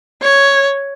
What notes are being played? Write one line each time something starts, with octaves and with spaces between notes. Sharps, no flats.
C#5